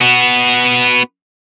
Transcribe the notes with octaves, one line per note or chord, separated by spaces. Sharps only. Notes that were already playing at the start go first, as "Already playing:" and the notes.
B3 F#4